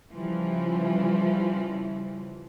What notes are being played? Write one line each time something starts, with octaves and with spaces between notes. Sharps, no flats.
C#3 E3 F3 G3